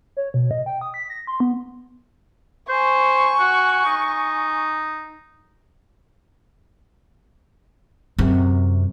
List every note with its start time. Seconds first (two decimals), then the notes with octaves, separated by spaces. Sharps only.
0.17 C#5
0.34 B2
0.51 D#5
0.66 G5
0.81 D#6
0.94 B6
1.10 A#6
1.27 C6
1.40 B3
2.69 C5 G#5 C#6
3.39 F#4
3.85 D#4
8.19 F#2 C3